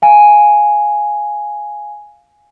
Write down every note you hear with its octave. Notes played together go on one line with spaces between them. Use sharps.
F5 G#5